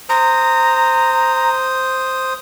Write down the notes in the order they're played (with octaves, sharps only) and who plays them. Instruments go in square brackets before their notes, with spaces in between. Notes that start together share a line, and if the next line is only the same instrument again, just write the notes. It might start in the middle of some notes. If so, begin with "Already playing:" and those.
[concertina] C5 D#6 [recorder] A#5